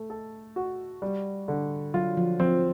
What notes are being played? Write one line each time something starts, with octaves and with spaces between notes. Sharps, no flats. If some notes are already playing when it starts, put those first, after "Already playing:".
Already playing: A3
A4
F#4
G3
D3
F#3 F4
F3
F3 C4